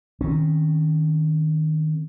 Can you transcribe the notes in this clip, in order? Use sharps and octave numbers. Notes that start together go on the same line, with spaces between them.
D#3 C4 C#4